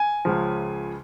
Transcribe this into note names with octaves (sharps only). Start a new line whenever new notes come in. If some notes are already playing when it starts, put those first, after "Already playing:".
Already playing: G#5
C#2 C#3 F3